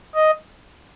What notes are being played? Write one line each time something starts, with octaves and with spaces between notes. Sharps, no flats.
D#5